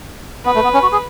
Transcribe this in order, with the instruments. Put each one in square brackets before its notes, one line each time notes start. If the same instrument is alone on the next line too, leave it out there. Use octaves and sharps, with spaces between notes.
[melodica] B3 [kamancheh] B4
[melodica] A3
B3
C#4
F#4
G#4